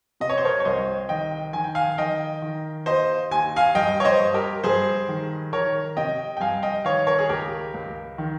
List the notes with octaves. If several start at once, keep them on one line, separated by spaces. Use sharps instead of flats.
C3 D#5
C#5
C5
A#4 C#5
C#5
C2 C5 D#5
D#3 D#5 G5
D#3 G#5
G5
F5 G#5
D#3 D#5 G5
D#3
D#2 C5 D#5
D#2 G#5
F5 G#5
G2 D#5 G5
C#5
C5 D#5
G2
G4 A#4
G2 G#4 C5
D#3
D#3 A#4 C#5
C3 D#5 G5
G5
G2 F5 G#5
D#5 G5
D#3 C#5 F5
A#4 C#5
G#4
C#2 G4 A#4
C#2
D#3